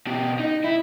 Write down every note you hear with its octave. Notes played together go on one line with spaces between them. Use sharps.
B2 G4
D#4
E4